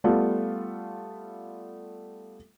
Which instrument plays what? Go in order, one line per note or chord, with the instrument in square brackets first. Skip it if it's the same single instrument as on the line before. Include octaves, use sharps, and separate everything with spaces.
[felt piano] G3 A3 B3 F4